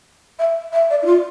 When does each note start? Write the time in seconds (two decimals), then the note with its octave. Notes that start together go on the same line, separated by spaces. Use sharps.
0.39 E5
0.73 E5
0.90 D5
1.02 E4
1.06 F4